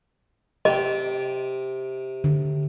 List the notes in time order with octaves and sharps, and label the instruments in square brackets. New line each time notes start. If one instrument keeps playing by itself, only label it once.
[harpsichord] C3 G5 [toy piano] D#5
[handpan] D3